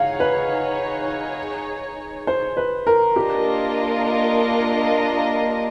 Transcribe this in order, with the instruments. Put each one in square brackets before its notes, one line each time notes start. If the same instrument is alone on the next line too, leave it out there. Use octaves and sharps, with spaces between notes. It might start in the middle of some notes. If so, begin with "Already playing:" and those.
Already playing: [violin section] D#4 G#4 C#5 [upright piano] F5 F#5
[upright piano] B4
C5
B4
A#4
[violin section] A#3 D4 F4 A#4 D#5 [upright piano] G4